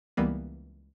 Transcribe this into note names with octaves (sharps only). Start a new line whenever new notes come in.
C#2 E3 G3 A#3 B3